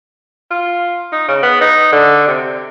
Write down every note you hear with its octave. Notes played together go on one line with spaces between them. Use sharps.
F4
D#4
C#3
B3
D#4
D3
C3